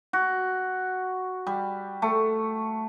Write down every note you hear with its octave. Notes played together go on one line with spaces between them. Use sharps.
F#4
G3
A3